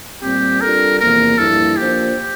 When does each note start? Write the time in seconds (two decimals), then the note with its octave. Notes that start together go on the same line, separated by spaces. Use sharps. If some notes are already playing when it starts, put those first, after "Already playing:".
0.22 A#2 G3 C4 G4
0.61 G3 D4 F4 A4 A#4
0.99 E2 C3 F3 A#3 A#4
1.38 G2 F3 A#3 E4 A4
1.76 F3 A#3 D4 F4 G4 C5